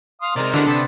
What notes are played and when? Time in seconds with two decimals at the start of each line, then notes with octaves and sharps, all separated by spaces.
0.21 F5 C6 D#6
0.36 C3 G#3 D#4 A#4 C5 D5
0.54 D3 B3 D4 E4 G4 F#5
0.66 C3 B3 C4 D4 A4 E5